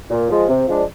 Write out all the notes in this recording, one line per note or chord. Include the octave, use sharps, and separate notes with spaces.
A#2
F3 G#3
C3
F3 G#3 D4